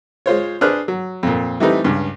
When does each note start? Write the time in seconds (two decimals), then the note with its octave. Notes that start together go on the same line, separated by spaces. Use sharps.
0.26 G#3 F4 C5 C#5
0.61 D4 G#4 B4 C5 F6 F#6
0.88 F#3
1.23 F2 A#2
1.60 E3 G3 A3 C4 D#4 B4
1.85 C#2 G2